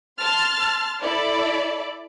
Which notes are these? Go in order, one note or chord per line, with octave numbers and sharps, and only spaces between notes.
A5 C6 F6 A6
E4 A4 D5